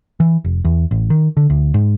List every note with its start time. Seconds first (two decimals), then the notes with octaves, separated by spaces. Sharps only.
0.20 E3
0.44 F1
0.64 E2
0.91 A1
1.10 D#3
1.37 D3
1.50 D2
1.74 G#2